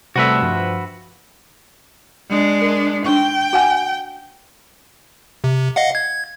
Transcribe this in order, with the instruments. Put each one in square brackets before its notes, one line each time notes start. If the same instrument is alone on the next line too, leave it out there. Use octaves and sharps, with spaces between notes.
[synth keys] C3 G3 A3 [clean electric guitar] F#4 B4 E5
[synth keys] G2 F3
[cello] G#3 D4
[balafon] A#4
[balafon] D4 C#6 [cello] G5
[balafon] F#4 F#5 G#5
[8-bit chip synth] C3
D#5 F5 F#5
G#6